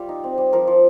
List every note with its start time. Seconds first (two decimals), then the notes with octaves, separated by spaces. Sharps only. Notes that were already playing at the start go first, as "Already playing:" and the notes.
Already playing: G3 F4 G4
0.09 D#4
0.24 C4
0.38 G3
0.53 F3 A#4
0.67 F3